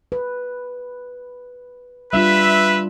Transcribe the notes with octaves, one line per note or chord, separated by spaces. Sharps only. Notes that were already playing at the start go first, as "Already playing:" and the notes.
B4
G3 D4 F4 B4 E5